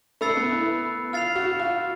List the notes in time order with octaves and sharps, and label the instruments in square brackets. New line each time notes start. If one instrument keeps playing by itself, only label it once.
[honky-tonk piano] A3 [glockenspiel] B5 E6 A6 C7
[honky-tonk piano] B3
E4
[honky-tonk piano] F4 [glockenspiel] F6 A6 C7 F7
[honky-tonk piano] F#4
F4